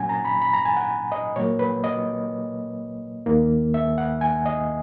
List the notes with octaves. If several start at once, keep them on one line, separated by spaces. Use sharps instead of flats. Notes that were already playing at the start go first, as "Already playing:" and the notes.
Already playing: A#2 F#3 C#4 F#5 G#5
A#5
B5
B5
A#5
G#5
F#5
D#5
A#2 F#3 A#3 C#5
B4
D#5
D#2 D#3 A#3
E5
F#5
G#5
D#5